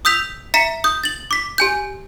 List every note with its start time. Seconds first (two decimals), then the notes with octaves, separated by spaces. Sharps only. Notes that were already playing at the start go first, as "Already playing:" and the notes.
0.05 D#6 E6 G6 B6 F7
0.54 E5 A#5 B6 C#7 E7
0.84 D#6 G6
1.04 A6 F#7
1.31 D6 B6
1.58 G4 G#5 G6